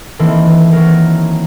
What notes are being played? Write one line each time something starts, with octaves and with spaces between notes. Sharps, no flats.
D#3 E3 A3 A#3 C4
F#3 A#4